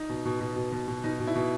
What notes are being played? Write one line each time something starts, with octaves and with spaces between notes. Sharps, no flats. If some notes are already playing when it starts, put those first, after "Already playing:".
Already playing: D#4
B2
B2
B2
B2
B2
B2
B2 D#4
B2
E4
B2